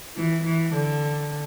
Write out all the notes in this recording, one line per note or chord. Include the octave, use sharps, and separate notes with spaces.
E3
E3
D3